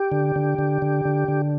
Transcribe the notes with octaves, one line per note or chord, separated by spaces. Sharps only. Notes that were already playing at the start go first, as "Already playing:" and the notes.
Already playing: G4
D3
D3
D3
D3
D3
D3